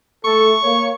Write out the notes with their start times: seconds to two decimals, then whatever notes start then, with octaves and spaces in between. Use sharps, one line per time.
0.25 A3 A4 C#6
0.63 A#3 C#5